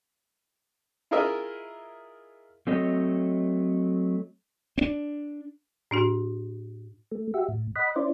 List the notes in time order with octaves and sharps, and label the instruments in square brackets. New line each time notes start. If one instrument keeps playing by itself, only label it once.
[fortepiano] E4 F4 G#4 A#4 D#5 E5
[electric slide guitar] F#3 A3 C4 A4 C#5 D#5
[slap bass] C4 D4
[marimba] A2 D4 F#4
[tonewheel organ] A3
F#4 G4 E5
A2
D#5 F#5 B5
C#4 E4 C5 D5